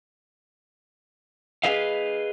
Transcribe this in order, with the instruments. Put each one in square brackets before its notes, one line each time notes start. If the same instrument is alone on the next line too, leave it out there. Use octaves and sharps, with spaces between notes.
[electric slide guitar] G#4 B4 D#5 F5